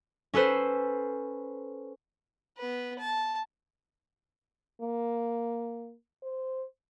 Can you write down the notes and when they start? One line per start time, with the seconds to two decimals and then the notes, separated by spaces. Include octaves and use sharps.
0.34 C#4 A4 B4 C5
2.57 B3 B4
2.99 A5
4.81 A#3
6.22 C5